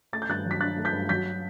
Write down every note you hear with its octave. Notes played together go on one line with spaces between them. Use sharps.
A3 A6
G6
G2 F#6 A6
F#3
B6
D4 F#6 A6
A3
G6 B6
G2
F#3 G6 B6